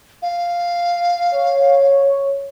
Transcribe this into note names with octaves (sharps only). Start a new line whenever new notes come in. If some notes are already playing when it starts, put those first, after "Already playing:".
F5
C#5